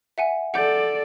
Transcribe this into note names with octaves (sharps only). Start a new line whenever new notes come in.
E5 F#5 G#5
A4 D5 F#5 G6